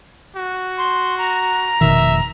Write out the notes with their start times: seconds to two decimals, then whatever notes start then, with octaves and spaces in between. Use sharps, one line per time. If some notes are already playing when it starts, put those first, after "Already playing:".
0.36 F#4
0.78 C6
1.18 A#5
1.81 F1 B2 D#3 E5